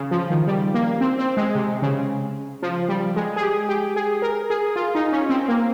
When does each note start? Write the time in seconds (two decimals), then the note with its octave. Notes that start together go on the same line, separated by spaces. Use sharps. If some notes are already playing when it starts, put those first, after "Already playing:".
Already playing: C#3
0.11 F3
0.30 D#3
0.47 G3
0.74 A#3
1.01 C4
1.19 C4
1.37 G#3
1.55 C3
1.82 C#3
2.63 F3
2.89 G3
3.16 G#3
3.36 G#4
3.42 G4
3.69 G4
3.96 G#4
4.22 A#4
4.50 G#4
4.76 F4
4.95 D#4
5.12 C#4
5.29 C4
5.48 A#3